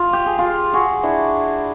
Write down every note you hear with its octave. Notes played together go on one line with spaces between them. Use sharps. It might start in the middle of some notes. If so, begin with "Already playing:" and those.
Already playing: F4
G4
G#4
F4 G4
F#4 G#4
D4 E4